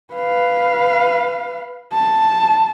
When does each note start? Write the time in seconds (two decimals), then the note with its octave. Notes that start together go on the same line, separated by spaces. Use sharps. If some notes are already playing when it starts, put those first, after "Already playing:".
0.14 B4 F5
1.93 A5